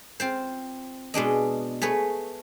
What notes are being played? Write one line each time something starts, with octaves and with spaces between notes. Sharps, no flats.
C4 F4 C5
B2 G#3 D4 D#5
A3 G#4 B4 C#5